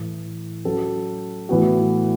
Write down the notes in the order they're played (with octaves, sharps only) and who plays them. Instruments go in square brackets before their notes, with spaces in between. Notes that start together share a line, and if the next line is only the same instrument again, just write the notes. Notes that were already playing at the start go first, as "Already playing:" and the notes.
Already playing: [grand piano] A2 E3 A3
F#3 C#4 F#4 A4
A2 E3 B3 F#4